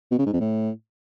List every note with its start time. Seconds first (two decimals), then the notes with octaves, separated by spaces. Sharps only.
0.11 B2
0.19 C#3
0.26 G#2
0.33 F2
0.41 A2